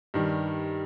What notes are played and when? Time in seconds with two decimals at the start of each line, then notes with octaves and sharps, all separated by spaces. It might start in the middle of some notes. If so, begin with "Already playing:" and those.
0.14 G2 D#3 G3